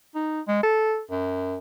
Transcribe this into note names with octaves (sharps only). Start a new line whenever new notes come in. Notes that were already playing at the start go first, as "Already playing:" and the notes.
D#4
G#3
A4
F#2